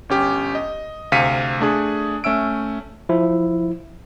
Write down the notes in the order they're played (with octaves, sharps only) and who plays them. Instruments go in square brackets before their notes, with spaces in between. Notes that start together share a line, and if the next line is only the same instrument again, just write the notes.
[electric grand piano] G1 C#4 G4
D#5
D2 C3 F5 B6 C#7 D#7
A3 D4 G#4
A3 C#4 E5 E6 D7
[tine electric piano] F3 E4